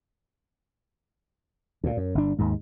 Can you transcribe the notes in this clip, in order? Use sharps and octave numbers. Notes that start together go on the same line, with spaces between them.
D2 A#2
F#2
G1 D4
D#2 G#2